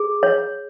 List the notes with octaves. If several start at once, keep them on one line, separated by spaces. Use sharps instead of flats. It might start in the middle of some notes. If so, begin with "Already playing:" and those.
Already playing: G#4
C#5